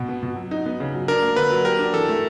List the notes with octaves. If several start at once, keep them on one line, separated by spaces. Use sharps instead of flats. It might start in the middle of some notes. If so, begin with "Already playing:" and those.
Already playing: B2
B3
B2
F#3
D#4
B3
C#3
F#3
D4 A#4
A#3
D3 B4
F#3
G4 A#4
D4
E3 A4
A3